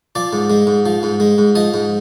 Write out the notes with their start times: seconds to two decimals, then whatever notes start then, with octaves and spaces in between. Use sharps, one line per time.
0.15 F3 D5
0.33 G#2
0.50 G#3
0.67 G#2
0.86 F3
1.03 G#2
1.20 G#3
1.38 G#2
1.55 F3 D#5
1.74 G#2